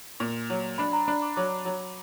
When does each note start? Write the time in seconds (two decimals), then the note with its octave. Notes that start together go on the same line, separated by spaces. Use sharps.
0.20 A#2
0.50 F#3
0.78 D4 B5
0.93 A#5
1.07 D4 B5
1.22 D6
1.37 F#3 D6
1.65 F#3